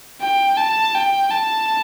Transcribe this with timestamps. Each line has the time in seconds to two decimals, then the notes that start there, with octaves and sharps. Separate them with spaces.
0.22 G5
0.57 A5
0.95 G5
1.31 A5